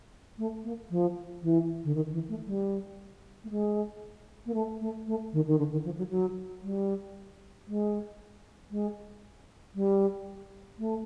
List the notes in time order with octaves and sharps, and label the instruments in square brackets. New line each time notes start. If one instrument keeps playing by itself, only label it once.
[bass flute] A3
A#3
F3
E3
D3
D#3
E3
A3
G3
A3
G#3
A#3
A3
A3
A3
D#3
D#3
D3
D#3
F3
F#3
F#3
G3
G#3
G#3
G3
A3